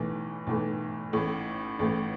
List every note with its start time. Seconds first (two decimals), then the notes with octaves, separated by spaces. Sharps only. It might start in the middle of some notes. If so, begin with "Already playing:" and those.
Already playing: B1 A2 E3 A3
0.47 B1 A2 E3 A3
1.13 A1 A2 A3
1.79 A1 A2 A3